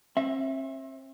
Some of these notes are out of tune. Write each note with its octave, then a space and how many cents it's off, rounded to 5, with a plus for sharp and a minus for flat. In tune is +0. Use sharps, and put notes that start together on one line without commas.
C4 +45 E5 +0